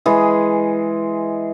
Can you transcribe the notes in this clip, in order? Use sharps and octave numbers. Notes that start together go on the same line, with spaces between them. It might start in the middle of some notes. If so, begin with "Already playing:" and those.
E3 G#3 G#4